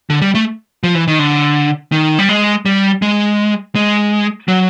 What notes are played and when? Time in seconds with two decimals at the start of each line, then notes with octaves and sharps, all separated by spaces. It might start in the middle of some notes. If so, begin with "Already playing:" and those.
0.10 D3
0.22 G3
0.35 A3
0.83 F3
0.95 E3
1.08 D#3
1.19 D3
1.92 D#3
2.19 G3
2.29 G#3
2.65 G3
3.02 G#3
3.75 G#3
4.48 F#3